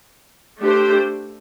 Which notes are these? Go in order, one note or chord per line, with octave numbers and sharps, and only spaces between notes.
A3 D4 G4 C5